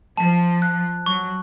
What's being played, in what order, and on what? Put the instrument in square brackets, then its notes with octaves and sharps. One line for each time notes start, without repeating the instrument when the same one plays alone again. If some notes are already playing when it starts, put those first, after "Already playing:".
[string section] F3 [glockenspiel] A5
[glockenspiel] F#6
[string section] F#3 [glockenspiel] C#6